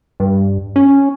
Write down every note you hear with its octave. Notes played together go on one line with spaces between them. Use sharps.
G2
C#4